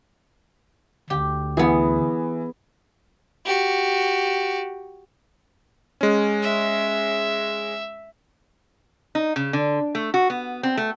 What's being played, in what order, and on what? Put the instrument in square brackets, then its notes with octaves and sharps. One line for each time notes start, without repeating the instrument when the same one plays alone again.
[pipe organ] D2 [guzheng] G4
[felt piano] E3 [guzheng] B3 G#4
[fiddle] F#4 G4
[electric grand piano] G#3 C#4
[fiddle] E5
[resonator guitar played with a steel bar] D#4
C#3
D3
A3
F#4
B3
C4
A3